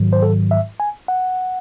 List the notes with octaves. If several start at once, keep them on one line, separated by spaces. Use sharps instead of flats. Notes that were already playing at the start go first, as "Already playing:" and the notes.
Already playing: G#2 D#3 F#3
C5
A4
E5
G#5
F#5